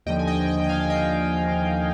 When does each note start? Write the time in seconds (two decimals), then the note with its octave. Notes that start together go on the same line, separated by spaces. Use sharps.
0.06 D#2 D3 F3 D#5 G5
0.19 G#5
0.27 D#5 G5
0.48 D#5 G5
0.64 G5
0.69 F5 G#5
0.81 G#5
0.90 D#5 G5